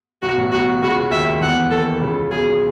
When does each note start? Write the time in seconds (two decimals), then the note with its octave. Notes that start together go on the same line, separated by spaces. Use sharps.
0.22 B1 B2 F#4
0.37 A1 A2
0.52 B1 B2 F#4
0.82 C#2 C#3 F#4
1.11 D#2 D#3 E5
1.41 E2 E3 F#5
1.71 D#2 D#3 A4
2.01 C#2 C#3
2.31 B1 B2 G#4